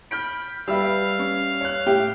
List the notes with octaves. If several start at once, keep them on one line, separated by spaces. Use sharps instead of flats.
B5 F6 G6 D7
G3 B4 E5 F5 E6
C#4
C#5 F#6
A2 G4 E5